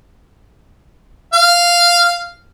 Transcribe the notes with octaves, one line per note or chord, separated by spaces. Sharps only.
F5